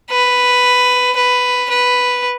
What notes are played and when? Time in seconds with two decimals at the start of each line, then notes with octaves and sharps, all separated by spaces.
0.11 B4
1.17 B4
1.70 B4